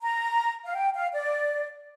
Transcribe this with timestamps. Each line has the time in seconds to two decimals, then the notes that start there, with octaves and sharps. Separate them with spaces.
0.02 A#5
0.65 F5
0.76 G5
0.94 F5
1.13 D5